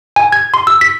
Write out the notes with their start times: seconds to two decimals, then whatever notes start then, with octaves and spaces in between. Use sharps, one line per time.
0.16 G#5
0.32 G#6
0.54 C6
0.67 E6
0.81 B6